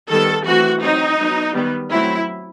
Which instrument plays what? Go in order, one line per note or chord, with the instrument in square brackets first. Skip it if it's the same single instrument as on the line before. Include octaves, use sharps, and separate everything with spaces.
[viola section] D#3 G3 B3 A4
E3 A3 C4 F#4
F#3 C4 D#4
F#3 B3
D#3 G3 B3
F#3 A3 C4 E4